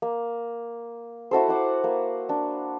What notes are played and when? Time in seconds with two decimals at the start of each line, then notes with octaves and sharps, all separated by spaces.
0.02 A#3
1.31 E4 F#4 A4 C5
1.48 E4 F#5 D6
1.84 A#3
2.29 D4